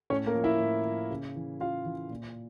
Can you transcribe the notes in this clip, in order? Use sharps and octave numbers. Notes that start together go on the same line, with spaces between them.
A2 C#4 C#5
A#3 A#4
F3
E4 E5
A2
F3
C#3
E3
C#3 F4 F5
E3
A#2